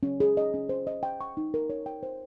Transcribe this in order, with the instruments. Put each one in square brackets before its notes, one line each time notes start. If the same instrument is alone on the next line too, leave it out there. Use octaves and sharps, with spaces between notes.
[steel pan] C#4
G#4
D#5
C#4
C5
D#5
G5
C#6
D#4
A#4
C#5
G5
C5